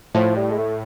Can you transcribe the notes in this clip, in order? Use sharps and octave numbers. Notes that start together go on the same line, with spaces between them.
A2 F3
G3
G#3
A3